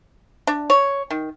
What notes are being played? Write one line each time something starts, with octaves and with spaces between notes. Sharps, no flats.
D4
C#5
D#3